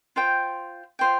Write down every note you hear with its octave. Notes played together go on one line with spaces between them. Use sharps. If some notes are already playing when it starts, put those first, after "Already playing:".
F4 C5 G5
F4 C5 G5